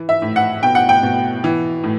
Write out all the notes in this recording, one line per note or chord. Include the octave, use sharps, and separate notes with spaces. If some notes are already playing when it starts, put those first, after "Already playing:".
Already playing: E3
E5
A2
F#5
B2 G5
F#5
G5
B2
E3
A2